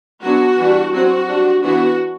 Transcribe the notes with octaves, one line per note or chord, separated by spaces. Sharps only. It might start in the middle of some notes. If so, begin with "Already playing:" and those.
F#3 B3 D4 F#4
E3 G3 D4
F#3 C4 F#4
G3 D4
E3 B3 D4 F#4